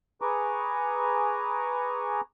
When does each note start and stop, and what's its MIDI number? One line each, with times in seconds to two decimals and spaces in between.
0.22 2.21 68
0.22 2.21 71
0.22 2.21 80
0.22 2.21 82
0.22 2.21 85
0.22 2.21 86